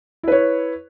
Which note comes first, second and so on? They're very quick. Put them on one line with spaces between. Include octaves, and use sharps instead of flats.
E4 B4 C#5